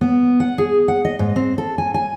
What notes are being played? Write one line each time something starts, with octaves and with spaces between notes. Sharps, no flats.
B3
F#5
G#4
F#5
D#5
G#2
C4
A4
G#5
G#5